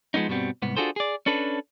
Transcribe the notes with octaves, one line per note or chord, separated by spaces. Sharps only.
F3 G#3 B3 C#4 D#4
G2 B2 G3 B3 C4
C2 G#2 B3
D4 F4 F#4 G#4 A4 C5
G#4 D5
C#4 D4 A4 B4